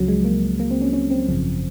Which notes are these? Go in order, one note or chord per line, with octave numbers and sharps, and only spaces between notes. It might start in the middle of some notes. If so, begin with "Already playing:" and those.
Already playing: C#2 C#3 F3 F#3
G#3
A#3
A#3
C4
C#4
C#4
C4
G#1 F#2 C#3 F3